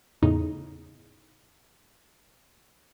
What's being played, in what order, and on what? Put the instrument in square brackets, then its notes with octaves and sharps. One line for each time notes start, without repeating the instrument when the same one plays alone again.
[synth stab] E2 A2 C#3 D#4